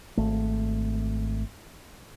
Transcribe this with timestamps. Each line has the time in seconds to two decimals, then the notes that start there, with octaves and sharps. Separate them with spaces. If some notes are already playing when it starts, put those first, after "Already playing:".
0.17 G#1 A3